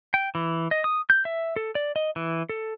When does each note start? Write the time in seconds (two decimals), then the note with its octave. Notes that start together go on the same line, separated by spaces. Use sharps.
0.14 G5
0.35 E3
0.71 D#5
0.84 D#6
1.10 G6
1.25 E5
1.56 A4
1.75 D5
1.96 D#5
2.16 E3
2.49 A4